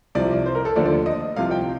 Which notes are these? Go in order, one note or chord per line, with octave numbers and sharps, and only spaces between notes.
C2 C3 F3 D5
C5
A#4
A4
D#2 D3 F3 A3 D5
D5
D#5
C2 C3 F3 F5
G5